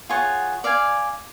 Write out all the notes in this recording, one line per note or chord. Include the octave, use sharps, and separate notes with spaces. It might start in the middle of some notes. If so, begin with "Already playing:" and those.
F4 G#4 C#5 F#5
D5 F5 G#5